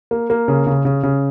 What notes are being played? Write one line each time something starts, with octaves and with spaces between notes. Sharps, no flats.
A#3
A#3
C#3
C#3
C#3
C#3